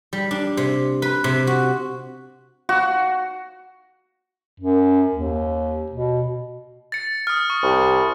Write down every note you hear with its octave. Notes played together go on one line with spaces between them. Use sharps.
G3
D4
C3
B4
C3
F#4
F#4
F#2
D#2
B2
A6 C#7
D#6 F6
C#6
C2